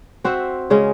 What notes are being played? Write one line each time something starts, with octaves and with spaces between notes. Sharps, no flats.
C4 F#4 C5 E5
C#3 G#3 C#4